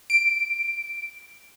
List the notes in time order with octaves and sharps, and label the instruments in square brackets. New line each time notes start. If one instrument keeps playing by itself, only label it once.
[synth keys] D7